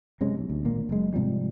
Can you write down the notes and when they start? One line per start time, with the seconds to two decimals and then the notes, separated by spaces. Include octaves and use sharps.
0.20 F#1 C3 G#3 C#4
0.37 B1
0.50 D2
0.65 G#1 A#2 A#3
0.89 F#1 F#2 G#3
1.14 G#2 C3 F3 G3